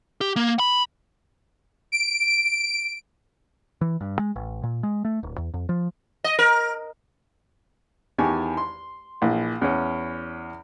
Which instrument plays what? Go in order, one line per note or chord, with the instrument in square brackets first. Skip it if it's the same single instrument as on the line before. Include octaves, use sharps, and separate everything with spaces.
[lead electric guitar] G4
A#3
B5
[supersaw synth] D7
[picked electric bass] E3
G2
G#3
A1
A#2
G#3
A3
D1
E2
F2
F3
[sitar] D#5
A#4
[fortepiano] E2 D#3 G4 G#5 A5 C#6
C6
A#1 E3
E2 C#4